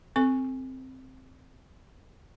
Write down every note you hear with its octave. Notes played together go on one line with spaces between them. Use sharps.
C4 A4 C#6